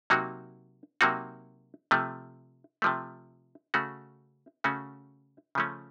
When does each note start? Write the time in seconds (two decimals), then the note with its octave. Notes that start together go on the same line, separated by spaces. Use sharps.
0.10 C3 F#3 A#3 D#4 F#4
1.01 C3 F#3 A#3 D#4 F#4
1.91 C3 F3 A3
2.82 C3 F3 A3
3.74 C#3 A3 C#4 F#4
4.64 C#3 A3 C#4 F#4
5.55 C#3 F3 A3 C#4